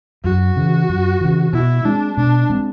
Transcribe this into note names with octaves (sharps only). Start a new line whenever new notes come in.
F#2 F#4
C#3 E3
F#2
C#3 E3
B2 E4
G#3 C4 D4
B2 D4
G#3 C4